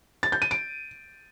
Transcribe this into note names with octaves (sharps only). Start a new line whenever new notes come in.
A6
G6
D#7
D7